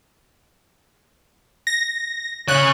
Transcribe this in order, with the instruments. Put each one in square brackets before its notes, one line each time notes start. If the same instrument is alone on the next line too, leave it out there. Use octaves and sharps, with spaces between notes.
[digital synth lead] A#6
[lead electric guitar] C#3 C#5 [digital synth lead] F#6